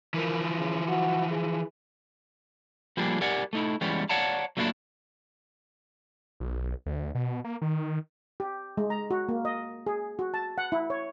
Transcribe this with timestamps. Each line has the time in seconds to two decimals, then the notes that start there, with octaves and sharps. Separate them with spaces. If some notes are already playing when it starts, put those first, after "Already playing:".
0.14 E3 F3 A#4
0.58 C#3
0.88 F#4
1.31 G#4
2.97 F3 G3 A#3 D4 G4 G#4
3.21 G4 A#4 D5 F#5 G#5
3.53 A3 D#4 E4
3.81 E3 G3 G#3 B3 C#4
4.09 C#5 D5 F5 F#5 A5 A#5
4.57 F#3 A3 A#3 D4 E4 F4
6.40 B1
6.86 D2
7.15 B2
7.44 A#3
7.62 D#3
8.40 G4
8.77 G#3
8.90 A#5
9.11 F#4
9.29 A#3
9.45 D#5
9.87 G#4
10.19 F#4
10.34 A5
10.58 F#5
10.72 E4
10.90 C#5